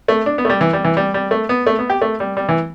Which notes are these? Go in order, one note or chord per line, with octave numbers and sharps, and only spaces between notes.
A3
D4
B3
A3
G3
E3
G3
E3
G3
G3
A3
B3
A3
B3
G4
A3
G3
G3
E3